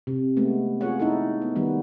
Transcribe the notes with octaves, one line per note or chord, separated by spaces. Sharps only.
C3
G#3 A3 B3
F4 G#4 C#5 F#5
D#4 E4 A4
B3
D#3 G3 B3 D4